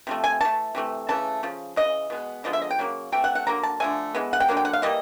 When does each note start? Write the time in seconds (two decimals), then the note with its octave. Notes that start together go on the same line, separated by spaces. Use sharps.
0.07 C3 F3 A3
0.24 G#5
0.41 E3 A3 A5
0.75 C3 E3 A3
1.09 C#3 E3 A3 A5
1.43 C#3 F3
1.76 C#3 E3 D#5
2.10 B2 G#3 B3
2.44 D3 F3 G#3 B3 D#5
2.53 E5
2.62 D#5
2.71 G5
2.79 C#3 F#3 A#3
3.12 C3 E3 A3 G5
3.24 F#5
3.35 F#5
3.47 D3 F#3 A#3 A#5
3.63 A5
3.80 D3 F3 A3 G#5
4.15 E3 G#3 B3
4.33 F#5
4.40 G5
4.49 D3 F#3 A#3
4.57 G5
4.65 F#5
4.73 F5
4.82 E3 G3 A#3 D#5